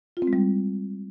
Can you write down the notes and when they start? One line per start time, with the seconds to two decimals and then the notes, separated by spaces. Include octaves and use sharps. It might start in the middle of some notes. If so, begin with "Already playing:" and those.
0.17 F4
0.22 C4
0.27 G#3
0.33 G3